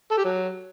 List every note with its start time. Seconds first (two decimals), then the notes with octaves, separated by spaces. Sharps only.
0.11 A4
0.18 G4
0.25 F#3